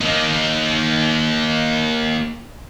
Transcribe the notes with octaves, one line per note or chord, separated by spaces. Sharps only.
A#3 D#4